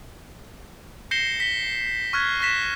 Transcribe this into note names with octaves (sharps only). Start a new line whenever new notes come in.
G6 A#6 C7 C#7 E7 G7
B6 G7
C#6 F6 F#6 G#6 B6
C#6 F#6 A#6 B6 E7